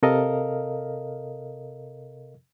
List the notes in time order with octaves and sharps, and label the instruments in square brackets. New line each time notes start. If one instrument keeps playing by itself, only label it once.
[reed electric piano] C3 A4 A#4 D#5 F5